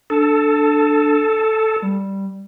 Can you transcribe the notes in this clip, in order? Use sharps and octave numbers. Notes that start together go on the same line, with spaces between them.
D4 A4
G3